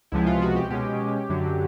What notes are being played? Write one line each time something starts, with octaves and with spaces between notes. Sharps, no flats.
C#2 C3 F3 G#3 B3 E4
F4
F#4
G4
B2 G#3 C#4 G4
F#2 D3 F#3